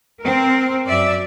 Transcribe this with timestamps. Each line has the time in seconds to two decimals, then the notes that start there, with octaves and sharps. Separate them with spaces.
0.20 C4 A#4
0.86 F#2 D5 E5